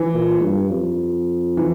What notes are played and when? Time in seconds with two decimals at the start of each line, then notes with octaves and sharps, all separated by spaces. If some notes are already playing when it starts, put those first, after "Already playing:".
Already playing: E3
0.14 A#2
0.43 G2
0.72 F2
1.57 E3